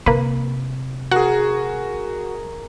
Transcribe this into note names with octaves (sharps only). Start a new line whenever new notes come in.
C3 A#3 B4
F#4 G#4 A#4 F#5